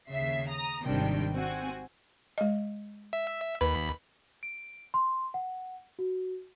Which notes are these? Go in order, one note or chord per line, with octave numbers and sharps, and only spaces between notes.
D#2 C#3 E5 C7
A#5 D#6
G#1 C3 D#3 G3 D4 G5
C4 F#4 G#5
G#3 D#5
E5
D#2 B4 B5
D7
C6
F#5
F#4